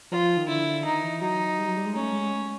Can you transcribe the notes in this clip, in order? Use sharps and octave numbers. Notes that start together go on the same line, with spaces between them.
F3 F4
D#3
D3 E4
D#3 D#4
E3
F#3 D#4
G3
F#3
G3
G#3
A3 C#4
G#3